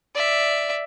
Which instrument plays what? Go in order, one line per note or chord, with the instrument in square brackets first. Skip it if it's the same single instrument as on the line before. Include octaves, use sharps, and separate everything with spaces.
[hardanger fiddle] D5 E5